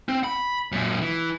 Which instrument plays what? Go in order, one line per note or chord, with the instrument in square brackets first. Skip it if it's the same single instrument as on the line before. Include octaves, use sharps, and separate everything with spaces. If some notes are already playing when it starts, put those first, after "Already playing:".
[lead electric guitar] C4
B5
F#2 A#2
E3